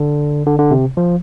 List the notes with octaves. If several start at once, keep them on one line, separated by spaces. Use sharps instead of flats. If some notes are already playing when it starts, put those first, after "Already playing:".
Already playing: D3
D3
D3
C3
F3